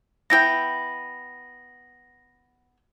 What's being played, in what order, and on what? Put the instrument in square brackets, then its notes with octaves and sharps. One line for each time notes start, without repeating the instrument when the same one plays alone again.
[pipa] B3 E4 G5 [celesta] A#6